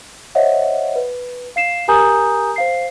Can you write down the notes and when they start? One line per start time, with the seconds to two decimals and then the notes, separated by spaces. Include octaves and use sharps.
0.35 C5 C#5 D#5 E5 F#5
0.96 B4
1.56 F5 C7 E7
1.88 G4 A#4 G#5 A#5 D#6 G6
2.56 C5 F5 C7